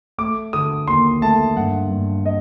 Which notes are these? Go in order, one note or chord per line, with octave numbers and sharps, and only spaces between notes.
A3 D6
D3 D#6
D#2 C6
A3 A5
G2 F#5
G2
D#5